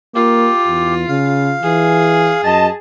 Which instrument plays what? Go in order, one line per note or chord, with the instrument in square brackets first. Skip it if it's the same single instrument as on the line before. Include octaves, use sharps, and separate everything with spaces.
[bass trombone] A#3 [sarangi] F4 [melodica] G4
[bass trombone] E2
[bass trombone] C#3 [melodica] F5
[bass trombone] E3 [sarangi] G#4
[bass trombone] F#2 [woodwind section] D#5 A5